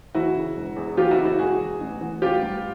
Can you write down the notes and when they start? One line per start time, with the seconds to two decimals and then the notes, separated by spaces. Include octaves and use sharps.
0.15 E3 E4 F#4
0.35 C#3
0.57 E1
0.77 E2
0.97 E3 F4 G4
1.11 E4 F#4
1.18 C#3
1.25 E4 F#4
1.39 E1 F#4 G#4
1.59 E2
1.81 A1
2.01 E3
2.22 A1 F4 G4
2.43 G2